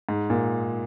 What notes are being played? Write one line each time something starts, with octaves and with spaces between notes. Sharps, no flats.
G#2
A#2